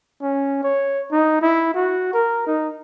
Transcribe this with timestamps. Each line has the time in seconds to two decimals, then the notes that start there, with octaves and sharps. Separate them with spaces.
0.22 C#4
0.63 C#5
1.12 D#4
1.42 E4
1.74 F#4
2.14 A#4
2.47 D#4